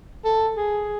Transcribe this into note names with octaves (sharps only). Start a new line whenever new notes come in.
A4
G#4